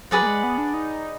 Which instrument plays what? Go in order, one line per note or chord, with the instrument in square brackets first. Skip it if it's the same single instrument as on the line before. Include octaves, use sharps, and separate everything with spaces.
[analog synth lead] F#3 [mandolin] G#4 B4 D5 F#5
[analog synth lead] A#3
G#3
B3
D4
D#4